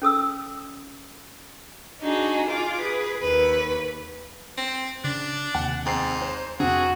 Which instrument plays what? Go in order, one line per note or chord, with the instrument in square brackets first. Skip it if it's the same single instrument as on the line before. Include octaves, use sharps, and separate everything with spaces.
[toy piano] C#4 A4 D#6 E6
[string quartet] D4 D#4 F#4 G#4
F4 G#4 D6
G#4 B4
D#2 B4
[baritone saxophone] C4
[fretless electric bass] C#3 [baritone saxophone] D4
[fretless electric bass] D#2 C3 [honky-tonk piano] F#5
[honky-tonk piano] F2 C4 C7 [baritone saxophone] G#2
[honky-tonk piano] C5
[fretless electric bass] F2 D4 [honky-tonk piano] C3 [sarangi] F#4 [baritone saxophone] G#4